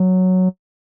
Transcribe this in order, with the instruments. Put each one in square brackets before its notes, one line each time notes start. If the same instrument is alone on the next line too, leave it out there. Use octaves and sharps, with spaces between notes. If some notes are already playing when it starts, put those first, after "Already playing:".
Already playing: [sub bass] F#3